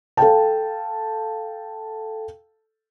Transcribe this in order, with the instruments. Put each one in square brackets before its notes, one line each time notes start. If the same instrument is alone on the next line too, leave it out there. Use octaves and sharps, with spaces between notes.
[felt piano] A4 F5 G5 A5